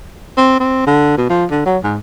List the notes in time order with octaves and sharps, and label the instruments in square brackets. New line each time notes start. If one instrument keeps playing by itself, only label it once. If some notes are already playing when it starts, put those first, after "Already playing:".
[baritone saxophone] C4
C4
D3
B2
F3
D3
F#3
G#2